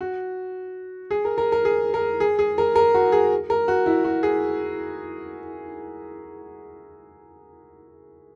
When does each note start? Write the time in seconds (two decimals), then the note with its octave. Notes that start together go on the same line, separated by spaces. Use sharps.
0.01 F#4
1.11 G#4
1.25 A#4
1.38 A#4
1.52 A#4
1.65 G#4
1.94 A#4
2.20 G#4
2.39 G#4
2.58 A#4
2.76 A#4
2.94 F#4
3.12 G#4
3.50 A#4
3.68 F#4
3.86 E4
4.04 F#4
4.23 G#4